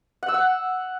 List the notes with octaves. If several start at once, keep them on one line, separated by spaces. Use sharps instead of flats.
F#5
E6
F#5